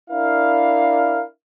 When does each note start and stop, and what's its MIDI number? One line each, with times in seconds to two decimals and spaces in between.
0.10 1.24 62
0.10 1.24 64
0.10 1.24 70
0.10 1.24 77